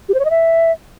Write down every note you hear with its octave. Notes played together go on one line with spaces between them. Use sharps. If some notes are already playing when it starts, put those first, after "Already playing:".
G4
C5
C#5
D#5
E5